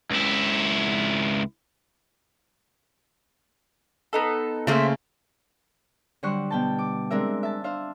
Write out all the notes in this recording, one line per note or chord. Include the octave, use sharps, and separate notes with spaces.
C#2 E4
B3 D#4 A4
C#3 A3 A#3 C5 E5
D3 F#3 G3 C5 C#6 F#6
B2 G5 A5
D6
G#3 C4 D4 A#4 E5
E5 A5
D4 C5 E5 F5